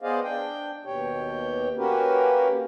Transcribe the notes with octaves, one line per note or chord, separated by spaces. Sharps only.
B3 G#4 C5 D5 D#5 F5
D4 G5
D#2 B2 G4 C#5 G5
A#3 C#4 F#4 G4 A#4 B4